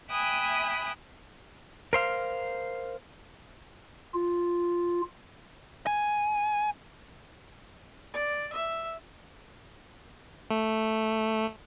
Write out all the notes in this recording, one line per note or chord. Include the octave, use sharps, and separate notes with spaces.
E5 G5 G#5 B5 D#6 F#6
A#4 C5 F5
F4
G#5
D5
E5
A3